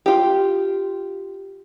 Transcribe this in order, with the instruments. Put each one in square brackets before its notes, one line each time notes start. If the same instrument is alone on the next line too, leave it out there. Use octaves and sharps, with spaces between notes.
[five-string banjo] F4 G4